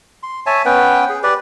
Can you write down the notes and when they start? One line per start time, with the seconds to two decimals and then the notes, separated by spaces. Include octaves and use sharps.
0.23 C6
0.46 C#5 E5 G#5 A5
0.65 B3 C#4 B4 G5
1.09 G#4
1.23 G4 B4 D5